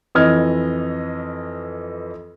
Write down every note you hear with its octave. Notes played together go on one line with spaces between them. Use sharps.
F2 E3 D#5 F6 G#6